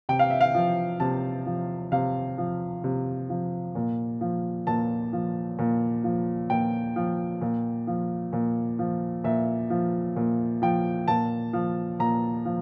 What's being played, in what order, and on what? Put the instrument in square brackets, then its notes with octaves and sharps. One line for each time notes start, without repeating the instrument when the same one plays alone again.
[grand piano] C3 G5
F5
E5
F5
F3
C3 A5
F3
C3 F5
F3
C3
F3
A#2
F3
A#2 A5
F3
A#2
F3
A#2 G5
F3
A#2
F3
A#2
F3
A#2 E5
F3
A#2
F3 G5
A#2 A5
F3
A#2 A#5
F3